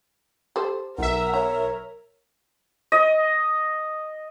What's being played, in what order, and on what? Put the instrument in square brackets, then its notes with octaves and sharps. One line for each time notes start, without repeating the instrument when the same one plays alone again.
[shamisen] G4 A4 C5
[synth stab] B1 E5 [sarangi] A#4 [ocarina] F#5
[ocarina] C#5 [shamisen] A#5
[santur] D#5